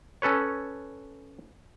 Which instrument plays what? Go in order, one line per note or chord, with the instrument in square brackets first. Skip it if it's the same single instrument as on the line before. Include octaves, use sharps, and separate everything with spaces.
[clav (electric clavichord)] C#4 A4 B4 C#5